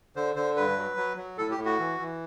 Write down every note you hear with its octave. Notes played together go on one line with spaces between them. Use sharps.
D3 C5
D3 C5
G2 B4
F#3
F#3
F#3
A2 A4
G4
A2
F#4
E3
E3